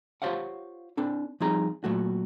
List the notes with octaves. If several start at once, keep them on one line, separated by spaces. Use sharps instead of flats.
F4 G4 C5 C#5 F5 F#5
C4 D4 A4
F3 G3 C4 D#4 G#4 A#5
A#2 F#3 A3 F#4